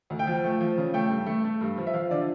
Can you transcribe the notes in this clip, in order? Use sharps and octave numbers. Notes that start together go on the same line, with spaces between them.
D2
G5
F3
A3
F3
C#3
A3 G5
G2
A3
A3
G2
F3
E5
F3 F5
D3 D5